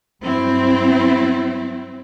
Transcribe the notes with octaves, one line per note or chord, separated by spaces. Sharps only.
G2 F#3 C4 E4